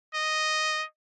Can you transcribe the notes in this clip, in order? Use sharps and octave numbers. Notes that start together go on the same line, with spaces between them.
D#5